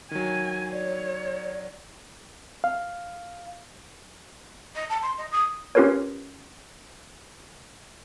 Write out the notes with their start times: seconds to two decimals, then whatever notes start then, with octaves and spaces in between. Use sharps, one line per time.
0.11 D#3 F#3 G#5
0.73 C#5 D5
2.64 F5
4.76 D#5
4.90 A5
5.02 C6
5.18 D#5
5.32 D#6
5.75 C#4 F4 G4 A#4 B4 C#5